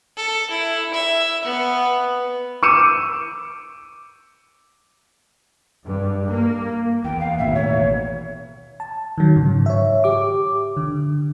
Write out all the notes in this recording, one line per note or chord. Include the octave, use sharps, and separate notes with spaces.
A4
E4
E5
B3
D6 E6 G6 C#7 D#7 E7
G2
A#3
E2 G5
F5
A1 D#2 B2 E5
C#5
A5
D#3 F#3
G#2 C#3
C#5 E5
G4 D6
D3